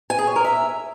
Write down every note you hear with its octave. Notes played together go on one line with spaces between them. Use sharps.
G#5
G#4
C#5
A#4
E5